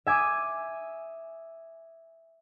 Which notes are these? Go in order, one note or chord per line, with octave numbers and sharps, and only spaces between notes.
E5 G#5 D6 D#6